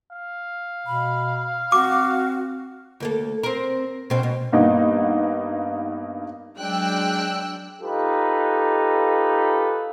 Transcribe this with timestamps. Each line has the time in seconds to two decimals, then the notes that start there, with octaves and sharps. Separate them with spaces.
0.11 F5
0.86 B2 B5
1.72 C4 F#4 D6
3.00 D2 A#3 A4
3.43 C4 A#4
4.10 B2 C4 C#4
4.23 B2
4.52 G2 A#3 B3 D#4
6.59 F#3 G#3 D4 G5 E6 F#6
7.82 D#4 F4 G4 A4 B4